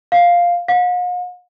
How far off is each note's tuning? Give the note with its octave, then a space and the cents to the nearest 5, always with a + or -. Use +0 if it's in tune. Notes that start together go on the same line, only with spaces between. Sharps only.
F5 +0
F5 +45